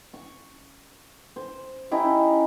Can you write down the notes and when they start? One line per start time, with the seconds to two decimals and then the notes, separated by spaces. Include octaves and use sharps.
0.14 C#6
1.36 C5
1.91 C#4 D#4 E4 G4